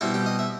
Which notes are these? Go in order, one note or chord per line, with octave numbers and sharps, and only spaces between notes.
B2 G3 C4 E4
G4
D#5
E5